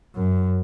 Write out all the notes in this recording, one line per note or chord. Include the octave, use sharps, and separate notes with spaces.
F#2